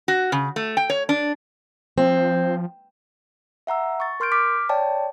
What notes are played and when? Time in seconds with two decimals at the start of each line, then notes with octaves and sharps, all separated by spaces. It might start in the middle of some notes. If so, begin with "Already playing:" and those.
0.08 F#4
0.32 C#3
0.56 A3
0.77 G5
0.90 C#5
1.09 D4
1.98 F3 C4
3.67 E5 F#5 A#5 E6
4.00 C#6 A6
4.20 A#4 C6 F6 G6 D7
4.32 D6 F6 B6
4.69 C#5 D5 G5 A5